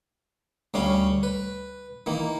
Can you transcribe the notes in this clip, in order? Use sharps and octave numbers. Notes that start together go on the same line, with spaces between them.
D2 G3 C#4 F5
B4
D#3 E3 A#3